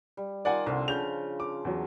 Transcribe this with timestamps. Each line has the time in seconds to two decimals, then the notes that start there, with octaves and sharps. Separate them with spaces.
0.17 G3
0.45 D#3 F4 D5 F#5 G#5
0.66 C2 D3 C4
0.88 C#3 F3 G6 F7
1.40 D6
1.65 E2 F#3